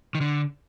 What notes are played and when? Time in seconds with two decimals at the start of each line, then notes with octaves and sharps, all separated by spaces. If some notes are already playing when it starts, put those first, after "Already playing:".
0.15 D#3
0.21 D3